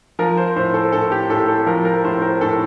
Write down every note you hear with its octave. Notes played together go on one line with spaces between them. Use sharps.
F3 A#4
C5
A2 C5
A4
A2 A4
G4
A2 A4
A4
F3 A#4
A#4
A2 C5
A#4
A2 A4